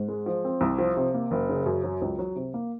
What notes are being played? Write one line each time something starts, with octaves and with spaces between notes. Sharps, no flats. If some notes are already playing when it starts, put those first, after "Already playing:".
Already playing: G#2
G#3
F3
C4
C2
F3
C3
A#3
F#1
C#3
F#2
F#3
C#2
F#3
C3
A#3